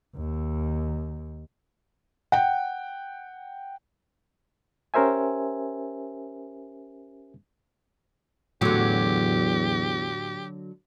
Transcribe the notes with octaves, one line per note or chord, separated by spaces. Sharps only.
D#2
F#5 G5
C#4 G4 A#4 C5 E5 G#5
E2 A2 D3 F#3 G4